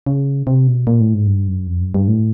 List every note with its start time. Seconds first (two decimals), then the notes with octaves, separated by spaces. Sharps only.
0.06 C#3
0.47 C3
0.67 B2
0.87 A#2
1.00 A2
1.14 G#2
1.27 G2
1.48 F#2
1.67 F2
1.81 F#2
1.94 G2
2.08 A2